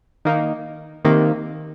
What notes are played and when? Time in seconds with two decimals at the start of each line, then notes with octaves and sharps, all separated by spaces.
0.25 D#3 A#3 D#4
1.05 C3 D#3 A#3